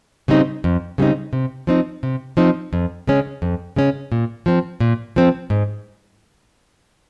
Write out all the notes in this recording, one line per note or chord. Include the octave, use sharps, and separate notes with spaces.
C#3 G3 C4 D#4
F2
C#3 G3 C4 D#4
C3
F3 C4 D#4
C3
F3 C4 D#4
F2
C#3 G#3 C#4
F2
C#3 G#3 C#4
A#2
F3 C4
A#2
F3 C4
G#2